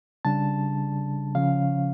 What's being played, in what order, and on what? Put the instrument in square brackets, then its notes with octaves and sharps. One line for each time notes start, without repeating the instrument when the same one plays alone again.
[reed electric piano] C#3 G3 D4 A5
C#3 F3 C#4 F5